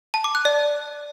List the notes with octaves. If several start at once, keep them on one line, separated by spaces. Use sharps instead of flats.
A5
D6
F#6
D5